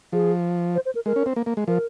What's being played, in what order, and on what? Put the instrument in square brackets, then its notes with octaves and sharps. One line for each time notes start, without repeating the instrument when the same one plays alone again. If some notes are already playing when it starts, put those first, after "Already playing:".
[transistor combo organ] F3 [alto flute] G#4
[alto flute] C5
C5
A#4
[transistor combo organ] G#3 [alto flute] A#4
[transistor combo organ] C#4
C4
A#3
A#3
G#3
[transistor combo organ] F3 [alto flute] A#4